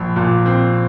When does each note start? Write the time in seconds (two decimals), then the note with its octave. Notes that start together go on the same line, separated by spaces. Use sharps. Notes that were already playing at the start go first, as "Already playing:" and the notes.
Already playing: A#1
0.16 A#2
0.46 C4